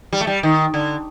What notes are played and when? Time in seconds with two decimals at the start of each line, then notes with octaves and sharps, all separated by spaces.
0.13 G3
0.21 A3
0.27 G3
0.43 D#3
0.74 D3